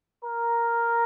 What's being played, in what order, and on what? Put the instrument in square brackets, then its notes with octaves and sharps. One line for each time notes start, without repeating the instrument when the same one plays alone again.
[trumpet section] A#4